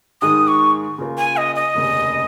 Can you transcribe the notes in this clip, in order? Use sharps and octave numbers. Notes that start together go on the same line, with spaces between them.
G#2 D#3 G#3 D#6
C#6
C#3 A#3 F4 A#4
G#5
D#5
D#5
F1 D#2 C#3